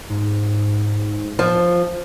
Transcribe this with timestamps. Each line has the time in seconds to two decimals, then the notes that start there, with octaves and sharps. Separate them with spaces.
0.10 G#2
1.39 F3